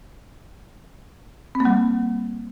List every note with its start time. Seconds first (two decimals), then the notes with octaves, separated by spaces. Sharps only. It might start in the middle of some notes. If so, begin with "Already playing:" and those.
1.55 C4
1.60 A#3
1.65 G3